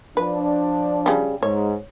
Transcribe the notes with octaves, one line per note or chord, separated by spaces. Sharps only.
F3 D4 B4
C#3 G3
G#2 C#5